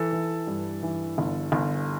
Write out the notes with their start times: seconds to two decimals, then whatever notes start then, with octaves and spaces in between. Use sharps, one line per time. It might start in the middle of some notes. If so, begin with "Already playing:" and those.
Already playing: E3 A4 A5
0.12 E3
0.47 G2
0.83 E3
1.18 G1
1.52 G1